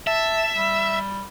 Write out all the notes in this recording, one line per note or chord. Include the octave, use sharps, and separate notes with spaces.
E5 A5
G3